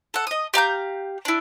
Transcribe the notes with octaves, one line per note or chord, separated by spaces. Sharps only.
A4 F#5
D#5 D#6
G4 F5 A#5 G6
D4 E4